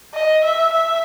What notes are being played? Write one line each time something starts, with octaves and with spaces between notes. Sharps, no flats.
D#5
E5
E5